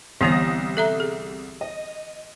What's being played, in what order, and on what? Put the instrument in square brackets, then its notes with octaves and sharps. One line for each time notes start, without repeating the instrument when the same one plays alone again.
[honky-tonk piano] C2 D#6 A#6 [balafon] D3 E3 B3
[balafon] A4 E5 A#5
G#4
[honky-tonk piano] D#5